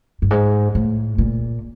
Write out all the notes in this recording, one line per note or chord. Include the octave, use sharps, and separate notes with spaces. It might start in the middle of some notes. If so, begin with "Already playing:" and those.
G2
G#2
A2
A#2